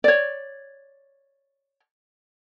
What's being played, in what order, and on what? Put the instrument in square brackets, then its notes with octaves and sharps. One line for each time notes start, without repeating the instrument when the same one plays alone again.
[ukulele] C#5 D5